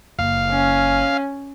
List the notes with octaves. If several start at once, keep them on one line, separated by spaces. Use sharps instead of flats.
F#1 F5
C#4